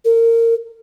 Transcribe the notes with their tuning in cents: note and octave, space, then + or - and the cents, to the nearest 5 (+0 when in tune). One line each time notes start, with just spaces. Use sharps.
A#4 -25